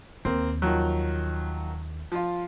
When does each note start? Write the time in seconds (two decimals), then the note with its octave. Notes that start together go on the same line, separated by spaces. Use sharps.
0.25 D#2 A#3 C4
0.62 D#3 F3 F#3
2.12 F3 F4